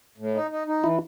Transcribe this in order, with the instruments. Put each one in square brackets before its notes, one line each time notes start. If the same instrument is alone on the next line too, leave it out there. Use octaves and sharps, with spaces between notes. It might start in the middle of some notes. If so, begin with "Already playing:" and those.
[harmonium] A2
D#4
D#4
D#4
[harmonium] E3 [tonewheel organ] E4